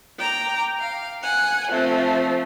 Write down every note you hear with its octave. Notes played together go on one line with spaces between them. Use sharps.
G5 A#5 D6
F5
F#5 G#5 F#6
F3 A3 C4